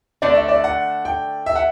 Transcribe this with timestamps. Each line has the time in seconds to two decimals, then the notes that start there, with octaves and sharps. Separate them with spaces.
0.22 D3 A3 D4 D5
0.35 E5
0.48 D5
0.64 F#5
1.05 G5
1.46 E5
1.55 F#5